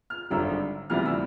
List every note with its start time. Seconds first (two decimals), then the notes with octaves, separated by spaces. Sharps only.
0.10 F6
0.30 G#1 F#2 D3 G3 E6
0.90 D2 C3 E3 G3 B3 F6
1.06 E6